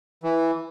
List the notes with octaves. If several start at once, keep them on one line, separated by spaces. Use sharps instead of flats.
E3